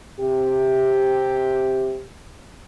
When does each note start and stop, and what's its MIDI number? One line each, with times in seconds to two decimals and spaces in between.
0.19 2.00 48
0.19 2.00 67